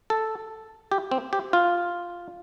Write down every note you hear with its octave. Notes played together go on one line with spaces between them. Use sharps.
A4
G4
C4
G4
F4